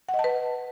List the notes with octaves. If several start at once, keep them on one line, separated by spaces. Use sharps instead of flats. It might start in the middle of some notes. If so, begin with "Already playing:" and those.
F#5
D#5
A5
B4